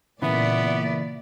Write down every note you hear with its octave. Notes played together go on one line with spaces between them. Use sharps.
A#2 C#3 E3 B3 D5 E5